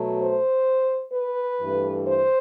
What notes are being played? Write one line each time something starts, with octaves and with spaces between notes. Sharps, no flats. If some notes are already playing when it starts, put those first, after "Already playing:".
Already playing: B2 F#3 A3
C5
B4
G2 E3 A3
C5